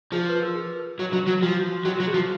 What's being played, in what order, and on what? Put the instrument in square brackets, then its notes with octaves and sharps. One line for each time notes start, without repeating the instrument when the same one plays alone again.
[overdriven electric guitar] F3 [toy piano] G#4
[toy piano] B4
A#4
G#4
[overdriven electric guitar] F#3
F#3
F#3
[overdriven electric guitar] F3 [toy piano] F#4
[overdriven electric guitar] F#3 [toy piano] F#4
[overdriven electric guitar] F#3 [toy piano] F#4
[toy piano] G#4
[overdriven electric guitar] F3